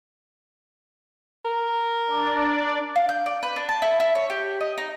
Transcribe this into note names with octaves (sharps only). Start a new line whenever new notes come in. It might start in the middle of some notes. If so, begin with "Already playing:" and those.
A#4
D4 D5
F5
G6
D5
B4
D4
A5
E4
E4
C#5
G4
D#5
D#4